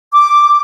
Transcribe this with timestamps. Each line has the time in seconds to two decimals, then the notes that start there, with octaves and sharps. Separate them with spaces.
0.12 D6